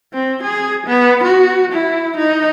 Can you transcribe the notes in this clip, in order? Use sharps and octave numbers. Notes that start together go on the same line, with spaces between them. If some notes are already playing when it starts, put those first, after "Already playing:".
C4
G#4
B3
F#4
E4
D#4